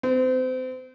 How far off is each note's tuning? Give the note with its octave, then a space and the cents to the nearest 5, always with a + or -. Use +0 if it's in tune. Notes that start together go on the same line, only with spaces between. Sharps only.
C4 -30